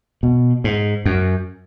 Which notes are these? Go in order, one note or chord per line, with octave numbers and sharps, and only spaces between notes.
B2
G#2
F#2